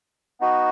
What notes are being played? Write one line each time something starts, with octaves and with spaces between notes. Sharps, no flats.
B3 D#4 F#4